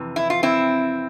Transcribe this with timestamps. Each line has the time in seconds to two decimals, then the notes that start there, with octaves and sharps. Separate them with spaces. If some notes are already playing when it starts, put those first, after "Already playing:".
Already playing: F2 C3 E3
0.16 E4
0.30 F4
0.43 C4 E4